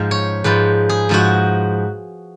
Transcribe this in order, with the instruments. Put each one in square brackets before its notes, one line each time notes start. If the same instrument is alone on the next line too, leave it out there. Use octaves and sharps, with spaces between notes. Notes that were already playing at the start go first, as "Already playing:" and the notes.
Already playing: [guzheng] G#2 F3 G#3 F5
C#5
G#2 F3 G#3 B4
G#4
G#2 F3 G#3 F#4